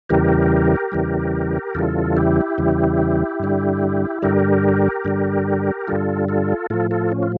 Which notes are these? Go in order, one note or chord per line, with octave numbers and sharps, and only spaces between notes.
E2 C#3 E3 G3 G4 A#4
E2 C#3 E3 G3
E2 C#3 E3 G3 F4 A4
E4 G4
E2 C#3 E3 G3
G2 D3 G3
G2 D3 G3 G4 A#4
G2 D3 G3
G2 D3 G3 F4 A4
F4 A4
A2 F3 F4 A4
F4 A4
C#4
F4